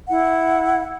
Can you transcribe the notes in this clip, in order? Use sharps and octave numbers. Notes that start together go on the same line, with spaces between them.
E4 F#5